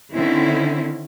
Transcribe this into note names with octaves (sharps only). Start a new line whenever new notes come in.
D3 D#3 C4 C#4 E4